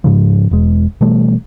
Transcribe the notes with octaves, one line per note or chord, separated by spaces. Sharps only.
G#2 C#3 F3
E1 G#3
B2 E3 G3 A3